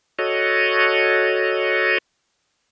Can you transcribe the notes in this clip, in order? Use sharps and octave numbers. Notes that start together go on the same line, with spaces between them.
F#4 A4 C#5 D#5